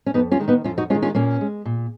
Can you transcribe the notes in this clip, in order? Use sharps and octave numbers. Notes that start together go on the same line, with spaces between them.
C#4
F2 B3 D#4
C#4 F4
D#3 G#3
B3 D#4
F2 C#4 F4
D#4 F#4
D#3 G#3 C#4 F4
C#4 F4
A#2 A#3 C#4
G#3
A#2